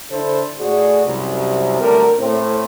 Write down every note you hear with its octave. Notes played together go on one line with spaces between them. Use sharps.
D3 D4 E4 A4 C5
A2 F#4 G#4 D5
C2 F#2 C3
D2 D3 F#3 G3 A3 A#4
A2 C4